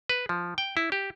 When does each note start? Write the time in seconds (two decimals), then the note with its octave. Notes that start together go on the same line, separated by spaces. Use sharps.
0.09 B4
0.29 F3
0.58 G5
0.77 E4
0.92 G4